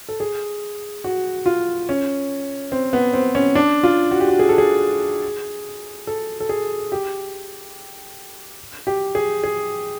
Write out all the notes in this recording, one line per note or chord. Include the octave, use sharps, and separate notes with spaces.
A4
G#4
F#4
F4
C#4
C4
B3
C4
C#4
D4
F4
F#4
G4
F#4
G#4
A4
G#4
A4
A4
G#4
G4
G4
G#4
G#4